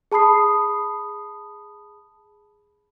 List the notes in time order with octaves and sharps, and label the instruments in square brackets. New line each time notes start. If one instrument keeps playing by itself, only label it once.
[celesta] G#4 A5 B5 D#6 C7